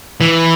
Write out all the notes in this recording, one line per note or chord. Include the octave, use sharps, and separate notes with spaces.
E3